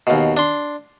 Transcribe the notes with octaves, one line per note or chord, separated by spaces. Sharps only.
D#2 B2
D4 C6